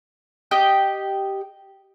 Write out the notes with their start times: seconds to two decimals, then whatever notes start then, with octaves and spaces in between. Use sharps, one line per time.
0.51 G4 D#5 G5